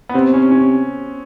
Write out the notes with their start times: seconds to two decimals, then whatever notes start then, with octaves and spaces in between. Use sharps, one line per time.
0.09 B3
0.14 C3 C4
0.33 C#4
0.51 C#4